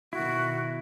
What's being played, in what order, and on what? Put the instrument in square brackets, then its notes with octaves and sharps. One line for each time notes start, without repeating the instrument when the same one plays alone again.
[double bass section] B2 D#3 [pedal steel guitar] E4 [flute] F#4